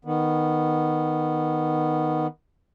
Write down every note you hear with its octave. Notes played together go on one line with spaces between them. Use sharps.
D#3 B3